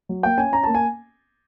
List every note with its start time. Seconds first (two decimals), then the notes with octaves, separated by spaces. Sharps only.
0.09 F#3
0.23 A#3 G5
0.38 C#4 G#5
0.52 C#4 A#5
0.63 A#3 A5
0.75 G#5